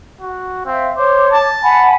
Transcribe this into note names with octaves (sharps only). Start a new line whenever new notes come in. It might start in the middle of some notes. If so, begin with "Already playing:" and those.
F#4
C4 E5 F5
C5 C#5 D6
A5
F#5 G#5 B5